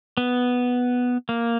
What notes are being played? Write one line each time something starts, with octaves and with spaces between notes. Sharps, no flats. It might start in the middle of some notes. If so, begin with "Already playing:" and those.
B3
A#3